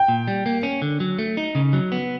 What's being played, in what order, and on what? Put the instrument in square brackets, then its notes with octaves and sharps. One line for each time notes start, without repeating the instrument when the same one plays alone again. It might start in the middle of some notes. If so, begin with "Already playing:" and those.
Already playing: [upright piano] G5
[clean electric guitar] A#2
G3
A#3
C#4
D3
F#3
A3
D#4
C#3
F#3
B3